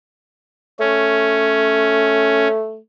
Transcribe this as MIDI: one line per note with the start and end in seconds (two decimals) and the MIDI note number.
0.80 2.78 57
0.80 2.48 61